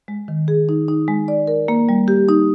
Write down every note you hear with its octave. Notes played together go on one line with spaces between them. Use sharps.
G#3
D#3
G#4
D#4
D#4
G#3
D5
A#4
A#3
G3
G4
D#4